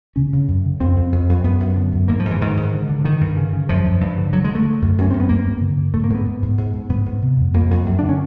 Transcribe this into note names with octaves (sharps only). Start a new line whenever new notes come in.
C#3 C#4
C#3
F#2
C#3
F2 C4
F2
F2
F2
F#2 B3
F#2
D3
F#2
G#2 A#3
F3
G#2
E3
G#2 D#3
G#2
D3
D3
D3 D#3
G2
C#3
C#3
F#2 F3
F#2
G2
D3
D3 F#3
D3 G#3
A3
D3
F#2
F#2 C#4
F#2 C4
B3
G2 A#3
G2
D3
D3
G#2 A3
A#3
G#2
B3
G#2
G#2
G#2
G#2
G#2 B3
G#2
C3
F2
F2 A#3
F2
F#2
D3 D4
C#4